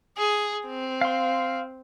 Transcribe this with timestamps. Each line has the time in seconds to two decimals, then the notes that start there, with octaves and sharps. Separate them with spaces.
0.17 G#4
0.67 C4
1.01 F5 C6